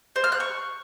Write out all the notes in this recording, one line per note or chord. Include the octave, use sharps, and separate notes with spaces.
C5
F6
F#6
C#6